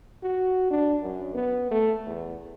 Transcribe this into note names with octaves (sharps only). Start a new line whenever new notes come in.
F#4
D4
F#2
B3
A3
E2